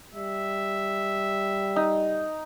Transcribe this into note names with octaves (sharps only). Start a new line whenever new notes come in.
G3 E5
D#4